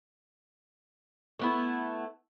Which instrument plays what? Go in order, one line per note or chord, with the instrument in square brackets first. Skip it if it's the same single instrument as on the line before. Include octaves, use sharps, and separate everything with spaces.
[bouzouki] A3 B3 E4